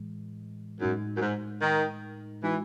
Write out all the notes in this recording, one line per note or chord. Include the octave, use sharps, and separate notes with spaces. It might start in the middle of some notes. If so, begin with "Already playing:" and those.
Already playing: A2 E3 G#3
F#2 A2 G#3 D#4
F#2
G#2
D#3
E3 G#3 D#4 F#4